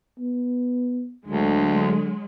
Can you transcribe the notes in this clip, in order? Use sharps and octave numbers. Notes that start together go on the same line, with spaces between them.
B3
D2 D3 F#3 G#3